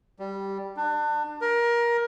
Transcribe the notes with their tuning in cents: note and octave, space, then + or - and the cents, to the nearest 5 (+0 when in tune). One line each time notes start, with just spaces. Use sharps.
G3 -5
D4 +30
A#4 +20